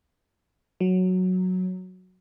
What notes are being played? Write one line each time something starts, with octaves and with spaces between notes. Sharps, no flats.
F#3